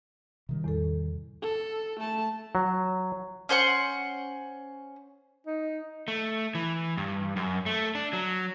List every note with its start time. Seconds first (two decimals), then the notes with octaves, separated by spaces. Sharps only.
0.49 C3 D#3 G3
0.64 E2 A2 A4
1.42 A4
2.00 A3 A5
2.55 F#3
3.49 C#4 C5 F#5 C#6
5.47 D#4
6.08 A3
6.55 E3
6.97 G2
7.36 F#2
7.66 A3
7.95 D4
8.13 F#3